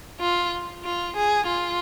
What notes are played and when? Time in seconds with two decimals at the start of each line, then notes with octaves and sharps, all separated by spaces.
0.20 F4
0.84 F4
1.16 G#4
1.48 F4